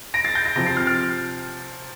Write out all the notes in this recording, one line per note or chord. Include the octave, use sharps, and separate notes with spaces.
A#6 D7
A6 C7
G6 A#6
A#6 D7
C3 F3 A#6 D7
A6 C7
F6 A6
F6 A6